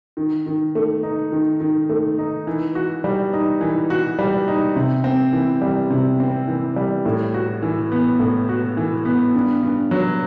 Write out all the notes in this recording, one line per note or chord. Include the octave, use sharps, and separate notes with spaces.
D#3
D#3
A3
D#4
D#3
D#3
A3
D#4
E3
F#4
G3
D#4
E3
F#4
G3
D#4
C3
C4
E3
G3
C3
C4
E3
G3
A2
F#4
E3
B3
A2
F#4
E3
B3
G2
G2
F#3